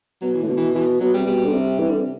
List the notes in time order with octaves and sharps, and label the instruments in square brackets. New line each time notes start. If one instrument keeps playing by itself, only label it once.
[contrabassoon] B2 [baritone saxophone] F#3
[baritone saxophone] E3
[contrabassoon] A2
[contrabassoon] B2 [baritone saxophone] D3
[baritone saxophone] E3
[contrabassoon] B2 [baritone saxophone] E3
[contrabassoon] B2 [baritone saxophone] F#3
[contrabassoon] C3 [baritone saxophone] G3
[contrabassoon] B2 [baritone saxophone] G3
[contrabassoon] D3
C3
E3
D3
C3